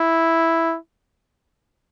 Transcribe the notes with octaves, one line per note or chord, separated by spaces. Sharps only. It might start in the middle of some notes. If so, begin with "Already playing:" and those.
Already playing: E4